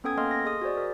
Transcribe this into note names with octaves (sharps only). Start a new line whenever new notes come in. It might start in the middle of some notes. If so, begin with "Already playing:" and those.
B3 C#4 A4 G5 D#6 G#6
A#3 A4 D#5 C6 F6
C6 A#6
G#4 D#5 D#6
F#4 G#4 C5 D5
A#4